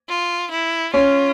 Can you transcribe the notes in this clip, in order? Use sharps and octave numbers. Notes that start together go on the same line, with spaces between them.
F4
E4
C#4 F4